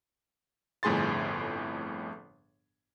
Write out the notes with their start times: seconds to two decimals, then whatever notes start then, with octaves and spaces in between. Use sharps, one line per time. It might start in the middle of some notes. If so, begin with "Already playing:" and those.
0.83 G1 F2 A2 G#4 C6 A6